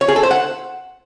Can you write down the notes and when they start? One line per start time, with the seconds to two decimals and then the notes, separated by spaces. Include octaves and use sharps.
0.01 C#5
0.08 G#4
0.16 A4
0.23 C5
0.31 F#5